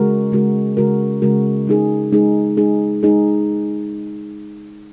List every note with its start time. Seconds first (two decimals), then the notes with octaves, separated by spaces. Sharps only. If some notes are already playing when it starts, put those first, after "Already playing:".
Already playing: C#3 G#3 F#4 A#4
0.32 C#3 G#3 F#4 A#4
0.77 C#3 G#3 F#4 A#4
1.22 C#3 G#3 F#4 A#4
1.67 G#3 D#4 G#4
2.12 G#3 D#4 G#4
2.57 G#3 D#4 G#4
3.03 G#3 D#4 G#4